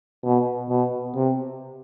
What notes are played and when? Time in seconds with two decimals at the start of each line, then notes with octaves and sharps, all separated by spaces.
0.25 B2
0.70 B2
1.15 C3